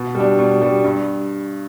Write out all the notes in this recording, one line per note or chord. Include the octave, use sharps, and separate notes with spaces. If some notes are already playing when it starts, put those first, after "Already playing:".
Already playing: B2
G3 D4
B2
G3 D4
G2